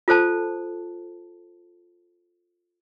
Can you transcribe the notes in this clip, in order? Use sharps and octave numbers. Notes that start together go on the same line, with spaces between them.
F4 A4 C5 A5